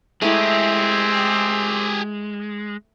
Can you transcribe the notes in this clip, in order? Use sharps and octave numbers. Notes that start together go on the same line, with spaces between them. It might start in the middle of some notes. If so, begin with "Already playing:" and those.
G#3 A3 C4 E4 G4 G#4